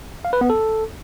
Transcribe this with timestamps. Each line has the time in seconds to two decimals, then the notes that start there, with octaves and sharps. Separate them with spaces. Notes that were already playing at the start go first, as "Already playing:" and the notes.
0.25 F5
0.33 B4
0.41 B3
0.50 A4